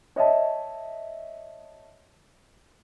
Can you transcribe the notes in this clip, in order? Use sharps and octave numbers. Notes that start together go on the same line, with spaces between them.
C#5 D#5 E5 A5